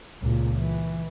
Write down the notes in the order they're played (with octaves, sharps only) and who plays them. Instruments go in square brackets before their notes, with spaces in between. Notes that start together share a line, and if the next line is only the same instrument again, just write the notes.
[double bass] C#2 A#2
E3